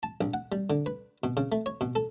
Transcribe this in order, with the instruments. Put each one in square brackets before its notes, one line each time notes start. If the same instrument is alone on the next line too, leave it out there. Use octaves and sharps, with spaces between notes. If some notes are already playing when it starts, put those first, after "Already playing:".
[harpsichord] A5
A#1
F#5
G3
D3
B4
B2
C#3
A3
C#5
B2
A4